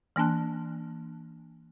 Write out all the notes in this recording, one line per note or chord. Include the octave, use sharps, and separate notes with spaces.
E3 A#3 D4 A5 F#6